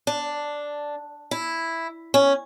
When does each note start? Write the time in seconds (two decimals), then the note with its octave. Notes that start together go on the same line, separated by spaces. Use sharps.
0.07 D4
1.31 E4
2.14 C#4